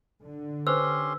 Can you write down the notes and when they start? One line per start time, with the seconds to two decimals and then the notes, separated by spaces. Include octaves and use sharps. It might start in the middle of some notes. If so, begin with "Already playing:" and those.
0.23 D3
0.67 C#4 G4 B4 C5 C6 E6